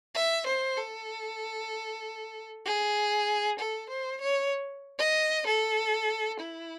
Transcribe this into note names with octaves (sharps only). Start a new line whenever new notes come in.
E5
C5
A4
G#4
A4
C5
C#5
D#5
A4
E4